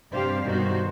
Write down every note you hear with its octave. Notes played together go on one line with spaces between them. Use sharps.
G2 C3 D4 G4 C5 F5
G2 B2 D#3 F#4 C5